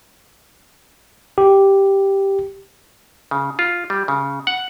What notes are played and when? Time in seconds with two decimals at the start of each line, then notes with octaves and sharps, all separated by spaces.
1.38 G4
3.31 C#3
3.59 F4
3.90 G3
4.08 C#3
4.47 F#5